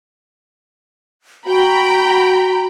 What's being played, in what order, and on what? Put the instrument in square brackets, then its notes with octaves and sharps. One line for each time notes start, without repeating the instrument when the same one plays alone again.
[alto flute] F#4 [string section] G5 A#5 B5